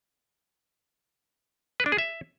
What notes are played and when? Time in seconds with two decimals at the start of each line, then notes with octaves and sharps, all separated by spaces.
1.80 B4
1.86 D4
1.92 G#4
1.98 E5